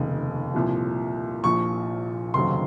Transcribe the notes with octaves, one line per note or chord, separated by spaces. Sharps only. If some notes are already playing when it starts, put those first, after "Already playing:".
Already playing: F1 D#2 C#3
C2 A#2 F3
A#1 A#2 F3 C#6
F1 D#2 C#3 F#3 C4 C6